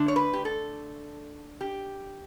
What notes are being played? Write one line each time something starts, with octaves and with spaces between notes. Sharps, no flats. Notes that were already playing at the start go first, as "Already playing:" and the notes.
Already playing: D3 A3 D4
C#5
B4
G4
A4
G4